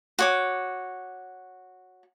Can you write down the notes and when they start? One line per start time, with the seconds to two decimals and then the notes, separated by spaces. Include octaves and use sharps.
0.19 F#4 C#5 D6